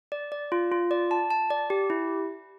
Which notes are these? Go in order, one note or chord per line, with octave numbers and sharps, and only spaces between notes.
D5
D5
F4
F4
D5
A5
A5
D5
G4
E4